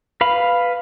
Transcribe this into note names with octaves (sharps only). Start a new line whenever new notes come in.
B4 F5 B5